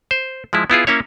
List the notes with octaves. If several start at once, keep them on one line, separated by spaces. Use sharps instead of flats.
C5
F3 G#3 E4
B3 E4 F4 G#4
A#3 C#4 E4 C#5